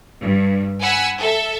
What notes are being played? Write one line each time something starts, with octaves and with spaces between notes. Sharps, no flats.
G2
F#5 G#5 B5 E6
A4 E5